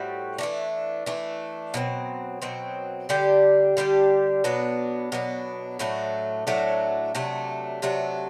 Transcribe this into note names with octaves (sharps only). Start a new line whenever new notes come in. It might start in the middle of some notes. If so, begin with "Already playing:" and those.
Already playing: A2 G3 C4 F#4
E3 A3 D4
E3 A3 D4
B2 F#3 C4
B2 F#3 C4
D3 G3 D4 G4
D3 G3 D4 G4
B2 F#3 B3 D4
B2 F#3 B3 D4
A2 F#3 A3 D4
A2 F#3 A3 D4
C3 F#3 A3 D4
C3 F#3 A3 D4